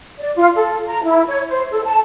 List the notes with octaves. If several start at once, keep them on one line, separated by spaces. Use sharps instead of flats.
D5
F4
A4
A#5
E4
C#5
C5
A4
A5